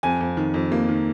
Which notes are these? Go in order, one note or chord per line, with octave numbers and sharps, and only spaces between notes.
F2 G#5
F2
D#3
F2
A#3
D#3